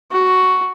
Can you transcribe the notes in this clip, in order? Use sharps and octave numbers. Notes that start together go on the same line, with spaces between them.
F#4